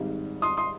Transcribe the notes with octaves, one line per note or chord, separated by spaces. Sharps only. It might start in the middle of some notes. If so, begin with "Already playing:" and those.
Already playing: G#1 G#2 G3
C6 D#6
C6 D#6